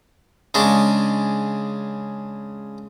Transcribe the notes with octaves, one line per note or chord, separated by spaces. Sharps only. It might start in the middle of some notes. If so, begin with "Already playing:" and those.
C#3 G#3 D4